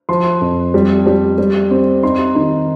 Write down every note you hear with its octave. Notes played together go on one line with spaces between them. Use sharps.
F3 C6
F2
G3
G3
G3
C4
D#4 C6
D#3